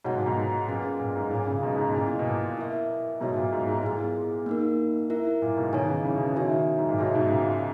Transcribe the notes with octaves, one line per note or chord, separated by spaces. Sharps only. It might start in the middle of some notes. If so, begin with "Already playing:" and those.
G#2 B2 F#4 C#5 F#5
A#2
G#2 B2
A#2 C#4 G#4 B4 F#5
A#2
G#2
A#2 G#4 C#5 G#5
A#2 C#3
G#2 B2
G#2 B2
A#2 A#3 E4 G#4 D#5
B2
A#2
E4 A#4 E5
G#2 B2 B3 F#4 C#5 E5
A#2
G#2
G#2
G#2
A#2 B3 E4 G#4
A#3 D#4 A#4
E4 A#4 E5
A#2
G#2 B2
B2 D#3 G#4 C#5 G#5
C#3 E3
C#3 E3
B2
C#3
B2 D#3 F#4 C#5 E5 G#5
G#2
A#2
G#2 B2 D#4 F#4 C#5 E5
G#2 B2
A#2 C#3